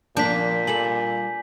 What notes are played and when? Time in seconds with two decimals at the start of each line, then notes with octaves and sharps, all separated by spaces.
0.17 A#2 F3 A#3 B3 D4 G6 B6
0.67 G3 F4 A4 G#5 F#7